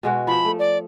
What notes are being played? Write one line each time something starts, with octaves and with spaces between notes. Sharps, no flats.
B2 G#3 F#4
F3 E5 B5
A3
D5